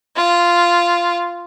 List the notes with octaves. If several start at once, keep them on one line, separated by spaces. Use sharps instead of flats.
F4